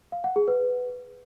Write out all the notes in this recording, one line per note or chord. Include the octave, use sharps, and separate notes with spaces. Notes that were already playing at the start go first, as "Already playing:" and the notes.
F5
F#5
G#4
B4